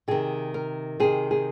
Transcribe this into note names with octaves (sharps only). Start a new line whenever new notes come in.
C3 D#3 G#4
A#4
C3 D#3 G#4
G#4